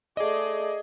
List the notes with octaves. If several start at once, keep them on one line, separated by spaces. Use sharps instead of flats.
A3 G#4 D5 D#5